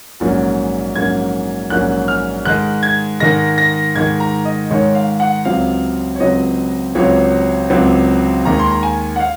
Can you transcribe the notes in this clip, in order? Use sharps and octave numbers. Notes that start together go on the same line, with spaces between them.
A#1 G#2 F#3 A#3 C#4
A#1 G#2 F#3 A#3 C#4 G#6
A#1 G#2 F#3 A#3 C#4 F#6
F6
G#2 D#3 G#3 F#6
G#6
G#2 D#3 G#3 A#6
A#6
G#2 D#3 G#3 G#6
A#5
D#5
G#2 D#3 G#3 C#5
F5
F#5
C#2 C3 F#3 C4 F5
C#5
C#2 C3 F#3 C4 D#5
C#2 C3 F#3 C4 C#5
C#2 C3 F#3 C4
D#2 D#3 G#3 A#5
C6
A#5
G#5
F#5
F5